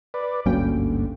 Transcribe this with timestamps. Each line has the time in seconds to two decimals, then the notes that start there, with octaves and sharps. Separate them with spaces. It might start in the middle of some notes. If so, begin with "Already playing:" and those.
0.14 B4 D5
0.46 G#1 D2 G2 F#3 A#3 C#4 G5